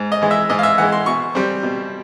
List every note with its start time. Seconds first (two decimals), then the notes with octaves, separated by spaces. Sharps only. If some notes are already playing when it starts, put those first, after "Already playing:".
Already playing: G#2
0.12 D#5
0.22 E3 G#3
0.31 E5
0.50 G#2 D#5
0.59 F5
0.63 E5
0.78 E3 G#3 F#5
0.92 C6
1.06 B2 C#6
1.35 G3 C4
1.63 B2